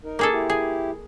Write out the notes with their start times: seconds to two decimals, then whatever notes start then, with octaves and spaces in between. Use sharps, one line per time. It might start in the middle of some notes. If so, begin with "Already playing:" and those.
0.04 D#4 A#4
0.19 A#3 G#4 A4
0.33 E4 G4
0.50 G#4